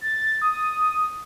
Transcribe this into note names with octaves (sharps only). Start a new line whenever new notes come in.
A6
D#6